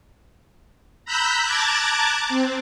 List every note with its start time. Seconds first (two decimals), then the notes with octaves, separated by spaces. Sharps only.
1.05 A#5 B5 E6 F#6 G6 B6
1.44 A5 A#5 D6 F#6 G#6 A6
2.29 C4